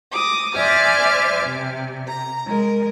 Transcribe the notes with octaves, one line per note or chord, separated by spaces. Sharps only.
D6 D#6 A#6
C5 D5 E5 G#5 D6 F6
C3
A#5
G#3 A#4